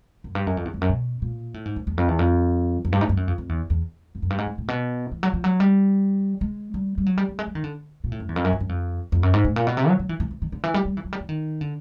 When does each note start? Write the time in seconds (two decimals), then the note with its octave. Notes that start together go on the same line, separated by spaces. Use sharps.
0.24 F#2
0.35 G2
0.47 F#2
0.57 F2
0.65 E2
0.74 F2
0.81 F#2
0.89 B2
1.22 A#2
1.54 A2
1.65 G#2
1.76 F#2
1.87 E2
1.97 F2
2.08 E2
2.19 F2
2.85 F2
2.92 G2
3.01 G#2
3.09 G2
3.17 F#2
3.28 F2
3.38 F2
3.49 E2
3.70 E2
4.15 F2
4.22 F#2
4.30 G2
4.38 G#2
4.46 A2
4.58 A2
4.68 B2
5.12 E3
5.23 F#3
5.34 F3
5.44 F#3
5.60 G3
6.41 G#3
6.74 G3
6.98 G3
7.06 F#3
7.18 G3
7.29 G3
7.39 G#3
7.47 G3
7.55 D#3
7.64 D3
8.04 A#2
8.12 A2
8.20 F#2
8.29 E2
8.36 F2
8.44 F#2
8.53 G2
8.60 F#2
8.69 F2
9.12 F2
9.23 F#2
9.33 G#2
9.44 A2
9.56 A#2
9.67 B2
9.77 C3
9.88 F#3
9.99 F#3
10.09 E3
10.20 E3
10.31 E3
10.42 D#3
10.52 D3
10.64 E3
10.74 G3
10.85 G3
10.97 E3
11.05 F#3
11.13 G3
11.20 E3
11.29 D#3
11.61 D3